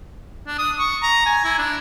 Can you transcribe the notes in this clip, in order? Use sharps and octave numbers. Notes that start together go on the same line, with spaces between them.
D4
D#6
C#6
A#5
G#5
E4
D4